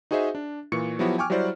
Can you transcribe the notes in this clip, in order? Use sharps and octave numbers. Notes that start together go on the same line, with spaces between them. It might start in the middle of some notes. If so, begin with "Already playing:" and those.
D#4 F#4 G#4 C5 D#5 E5
D4
A#2 E3 C#6 C#7
F3 F#3 B3 E4 F#4 G4
G5 G#5 C#6 D6 F6
F#3 G3 E4 F#4 C5 D5